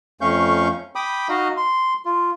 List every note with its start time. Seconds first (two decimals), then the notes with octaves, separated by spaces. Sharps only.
0.21 F2 A3 C#4 F5 C#6 G6
0.96 G5 B5 D6 D#6
1.29 D#4 F#4 D#5 F5
1.57 C6
2.05 F4